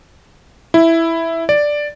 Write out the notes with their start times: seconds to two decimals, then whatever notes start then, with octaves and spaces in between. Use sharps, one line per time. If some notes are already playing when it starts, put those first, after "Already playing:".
0.74 E4
1.49 D5